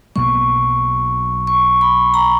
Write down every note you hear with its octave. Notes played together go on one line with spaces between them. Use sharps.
B1 B2 F#3 A#3 C#6
C#6
B5
A#5